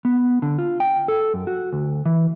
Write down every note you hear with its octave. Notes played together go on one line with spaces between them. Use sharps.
B3
D3
F4
G5
A4
F#2
F#4
D2
E3